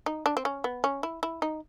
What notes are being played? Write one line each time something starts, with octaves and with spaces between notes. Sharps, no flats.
D#4
D4
C4
C#4
B3
C#4
E4
E4
D#4